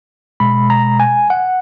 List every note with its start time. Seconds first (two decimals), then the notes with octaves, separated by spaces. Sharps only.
0.40 B2 G#3 B5
0.70 A#5
1.00 G#5
1.30 F#5